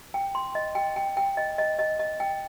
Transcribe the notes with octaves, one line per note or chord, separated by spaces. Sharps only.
G5
C6
D#5
G5
G5
G5
D#5
D#5
D#5
D#5
G5